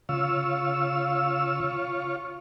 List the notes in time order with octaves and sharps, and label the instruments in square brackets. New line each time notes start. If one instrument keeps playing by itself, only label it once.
[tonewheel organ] C#3 F5 E6 [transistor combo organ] F4 C#5